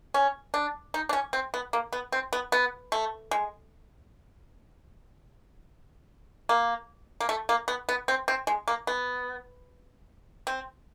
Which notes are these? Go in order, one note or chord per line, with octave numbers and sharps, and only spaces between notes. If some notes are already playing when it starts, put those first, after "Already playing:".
C#4
D4
D#4
D4
C#4
C4
B3
A#3
B3
C4
B3
B3
A3
G#3
A#3
A#3
A3
A#3
B3
B3
C4
C4
G#3
A#3
B3
C4